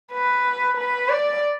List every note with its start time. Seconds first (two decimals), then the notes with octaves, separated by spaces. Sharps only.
0.12 B4
0.77 B4
1.09 D5